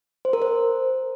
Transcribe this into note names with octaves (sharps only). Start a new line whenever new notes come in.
C5
A#4
C5